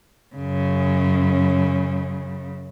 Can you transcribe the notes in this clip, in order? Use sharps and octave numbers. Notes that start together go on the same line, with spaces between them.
F#2 C#3